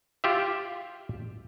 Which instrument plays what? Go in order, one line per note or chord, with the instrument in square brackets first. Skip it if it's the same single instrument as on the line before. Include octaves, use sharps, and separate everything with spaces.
[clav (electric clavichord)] F4 G4 E5